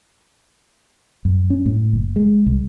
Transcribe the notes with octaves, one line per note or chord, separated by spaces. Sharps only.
F#2
C#4
A2
F#1
G#3
C2